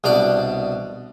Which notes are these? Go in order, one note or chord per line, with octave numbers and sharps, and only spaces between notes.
C2 B2 D4 D5 D6